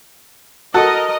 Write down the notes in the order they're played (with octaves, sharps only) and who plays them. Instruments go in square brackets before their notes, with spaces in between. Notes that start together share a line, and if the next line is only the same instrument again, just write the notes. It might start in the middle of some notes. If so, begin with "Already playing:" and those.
[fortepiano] F#4 A4 [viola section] A#4 D#5